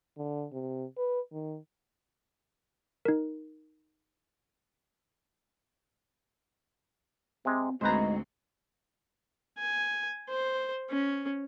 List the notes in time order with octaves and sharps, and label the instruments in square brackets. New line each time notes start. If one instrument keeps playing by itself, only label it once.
[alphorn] D3
C3
B4
D#3
[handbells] D#4 A#4
[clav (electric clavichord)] C3 G#3 [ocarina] C4
[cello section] D2 C4 F#4 [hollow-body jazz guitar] G#2 A#5 [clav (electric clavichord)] B4 C5 [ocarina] D#5
[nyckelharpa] G#5
C5
C#4